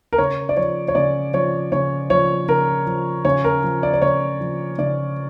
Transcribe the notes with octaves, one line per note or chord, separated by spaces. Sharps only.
A#4
C#3 C#5
D5
F3 C#5
C#5
C#3 D5
F3 C#5
C#3 C#5
F3 C#5
C#3 A#4
F3
C#3 C#5
A#4
F3
D5
D5
C#3 C#5
F3
C#3 D5